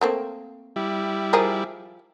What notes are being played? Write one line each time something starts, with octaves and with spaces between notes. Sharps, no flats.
A3 A#3 C4
G3 E4
F3 G#4 A#4